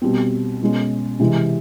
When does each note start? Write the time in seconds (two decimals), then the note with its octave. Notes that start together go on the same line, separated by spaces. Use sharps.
0.02 B2 G3 C4
0.61 B2 G#3 C#4
1.20 C3 E3 G#3